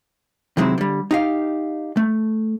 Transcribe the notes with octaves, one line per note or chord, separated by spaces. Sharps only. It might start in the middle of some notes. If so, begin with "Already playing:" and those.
C3 D#3 F#3 G#3 C4 E4
D3 G3
D#4 G4 F5
A3